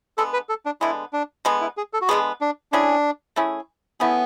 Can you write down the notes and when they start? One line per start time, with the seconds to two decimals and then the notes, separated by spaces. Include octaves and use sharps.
0.18 D3 G#3 B3 A4
0.33 B4
0.49 A4
0.66 D4
0.81 D3 G#3 B3 E4
1.13 D4
1.45 D3 G#3 B3
1.61 E4
1.77 G#4
1.93 A4
2.01 F#4
2.09 D3 G#3 B3 G#4
2.41 D4
2.72 A3 C#4 D4 E4 G#4
3.36 A3 C#4 E4 G#4
4.00 A3 B3 C#4 E4 G#4